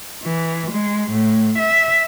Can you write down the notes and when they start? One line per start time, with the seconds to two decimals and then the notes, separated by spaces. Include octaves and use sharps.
0.23 E3
0.72 G#3
1.11 A2
1.57 E5